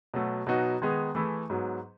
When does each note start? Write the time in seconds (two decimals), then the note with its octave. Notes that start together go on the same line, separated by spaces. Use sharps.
0.14 B2 F#3 A3
0.47 B2 F#3 B3 D#4 F#4
0.82 D#3 G#3 B3 D#4 G#4
1.15 E3 A3 E4 G#4
1.50 G#2 F#3 B3